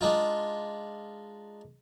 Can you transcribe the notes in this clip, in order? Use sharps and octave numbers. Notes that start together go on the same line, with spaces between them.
G#3 D4 D#4 F4